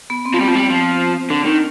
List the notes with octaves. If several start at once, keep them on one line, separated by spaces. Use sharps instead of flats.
B3
C4
F3 B3
G3 C4
F3
G3
F3
D3 D4
D#3